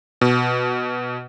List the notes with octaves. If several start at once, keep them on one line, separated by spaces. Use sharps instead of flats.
B2